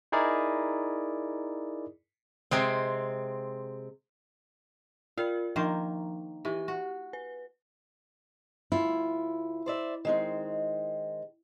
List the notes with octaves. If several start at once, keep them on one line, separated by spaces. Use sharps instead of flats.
D#4 E4 G#4 A#4 D5
C3 G#3 C4
F4 A#4 D5 F5
D#3 F3 A#3 C5
E3 G4 C#6
F#4
B4
D2 E4 F4
C5 D5 E5
D#3 G#3 C4